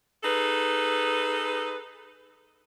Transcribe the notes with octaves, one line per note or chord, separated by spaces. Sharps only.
D#4 G#4 A4 B4